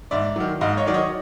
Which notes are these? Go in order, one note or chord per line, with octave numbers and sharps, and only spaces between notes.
G#2 D5 E5
D#3 F#3
G#2 D#5 F5
C#5 D#5
D#3 F#3 D5
C#5 D#5